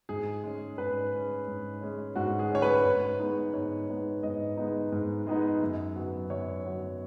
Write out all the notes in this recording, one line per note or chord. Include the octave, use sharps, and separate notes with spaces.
G#2 G#4
G#3 C#4
G#2 B4
G#3 C#4
G#2
G#3 C#4
G#2 F#4
G#4
G#3 C#4 C#5
B4
G#2
G#3 B3 D#4
G#2 C#5
G#3 B3 D#4
G#2 D#5
G#3 B3 D#4
G#2
G#3 B3 D#4
F#2
F#3 B3
F#2 C#5
F#3 B3